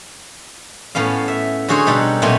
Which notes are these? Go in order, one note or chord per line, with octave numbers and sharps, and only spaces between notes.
A2 B3 C#4 F5
E5
D3 C#4 F#4 G#4 C5 C#5
B2 G3 D#4 A4 F#5
A#2 F#3 A3 B3 C#4 G5